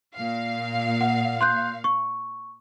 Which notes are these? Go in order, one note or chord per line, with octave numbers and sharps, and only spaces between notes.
A#2 F5
F#5
C6 F#6 G6
C#6